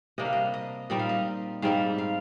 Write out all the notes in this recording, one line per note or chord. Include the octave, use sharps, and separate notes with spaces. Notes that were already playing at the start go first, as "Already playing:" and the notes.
C3 G3 A#3 D4 D#5
F5
D#5
D#5
A#2 G3 C4 D#4 D#5
F5
D#5
G#2 G3 C4 D#4 F5
F5